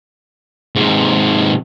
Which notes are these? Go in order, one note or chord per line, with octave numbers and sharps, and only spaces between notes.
G#2 C3